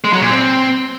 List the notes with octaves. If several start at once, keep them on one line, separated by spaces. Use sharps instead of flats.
G#3
F#3
A#2
C4